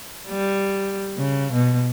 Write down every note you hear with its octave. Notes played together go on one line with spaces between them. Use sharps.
G3
C#3
B2